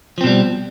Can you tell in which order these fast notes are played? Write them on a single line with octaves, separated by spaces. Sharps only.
F3 C4 B2 G3